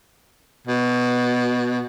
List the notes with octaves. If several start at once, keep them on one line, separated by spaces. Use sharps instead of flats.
B2